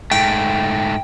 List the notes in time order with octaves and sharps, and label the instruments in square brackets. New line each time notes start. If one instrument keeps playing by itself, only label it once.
[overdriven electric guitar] G#2 A3 [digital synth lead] G5